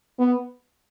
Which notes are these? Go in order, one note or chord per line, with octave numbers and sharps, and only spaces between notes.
B3